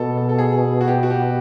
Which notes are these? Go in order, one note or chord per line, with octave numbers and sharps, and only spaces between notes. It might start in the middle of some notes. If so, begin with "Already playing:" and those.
Already playing: B2 A4
A4
A4
G#4
F#4
G4
F#4
G4